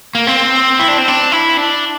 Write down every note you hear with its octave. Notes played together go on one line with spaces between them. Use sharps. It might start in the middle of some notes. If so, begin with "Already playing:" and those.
A#3
C4
E4
D4
C4
D4
E4
D4